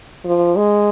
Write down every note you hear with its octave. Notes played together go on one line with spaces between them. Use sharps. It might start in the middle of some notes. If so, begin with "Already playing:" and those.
F3
G#3